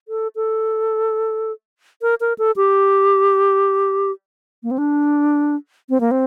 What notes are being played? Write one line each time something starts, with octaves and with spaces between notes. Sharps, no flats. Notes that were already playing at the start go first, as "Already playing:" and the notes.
A4
A4
A#4
A#4
A4
G4
A#3
C4
D4
C4
A#3
C4